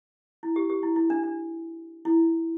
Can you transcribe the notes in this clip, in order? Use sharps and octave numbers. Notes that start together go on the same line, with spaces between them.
E4
G4
G4
E4
E4
D4
D4
E4